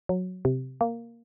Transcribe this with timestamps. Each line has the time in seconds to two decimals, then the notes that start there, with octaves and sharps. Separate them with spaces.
0.09 F#3
0.45 C3
0.81 A#3